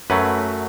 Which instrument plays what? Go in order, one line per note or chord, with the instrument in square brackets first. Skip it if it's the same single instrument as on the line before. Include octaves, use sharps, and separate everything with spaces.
[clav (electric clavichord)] F#2 F#3 A3 B4